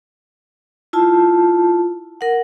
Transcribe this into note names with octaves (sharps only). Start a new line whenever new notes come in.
E4 F4 A5
A#4 F#5